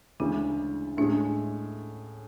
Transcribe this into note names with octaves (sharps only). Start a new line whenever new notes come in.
D2 C#3 E3 G#3 E4
A2 G#3 C#4 D4 G#4